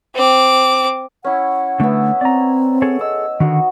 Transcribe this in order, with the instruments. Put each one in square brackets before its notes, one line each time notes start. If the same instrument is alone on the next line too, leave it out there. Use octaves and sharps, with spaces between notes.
[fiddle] C4 D6
[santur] C#4 E4 [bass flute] F#5
[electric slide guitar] D3 A3 [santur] B3 E5
[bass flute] C4 [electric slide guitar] D5 A#5
[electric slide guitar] G#4 A4 C#5
[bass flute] D#5 [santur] E6
[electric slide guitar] D3 D#3 [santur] D#4 F#4